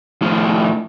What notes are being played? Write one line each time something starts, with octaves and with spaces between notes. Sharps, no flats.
A2 F3